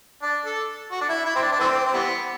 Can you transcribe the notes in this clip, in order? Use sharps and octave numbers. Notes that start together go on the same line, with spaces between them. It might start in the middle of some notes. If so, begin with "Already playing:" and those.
D4
A4
F#4
D4
E4
E4
C4
D4
D4
E3 A3 C4
C4
E3 G3 B3